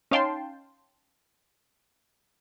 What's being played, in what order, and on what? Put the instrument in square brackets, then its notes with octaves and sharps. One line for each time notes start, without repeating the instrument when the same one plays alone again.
[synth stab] C#4 D#4 F5 G5 A5 C6